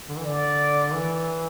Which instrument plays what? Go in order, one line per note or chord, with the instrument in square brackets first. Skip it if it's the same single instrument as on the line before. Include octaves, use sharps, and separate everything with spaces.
[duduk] D3
E3
[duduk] D3 [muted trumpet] D5
[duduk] E3